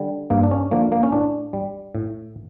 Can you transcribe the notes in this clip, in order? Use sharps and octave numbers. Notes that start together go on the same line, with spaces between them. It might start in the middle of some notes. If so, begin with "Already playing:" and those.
Already playing: D3 G3
G2 A#3
D4
C#4
D3 F3 A#3
A#3
C#4
A2 D4
G3
A2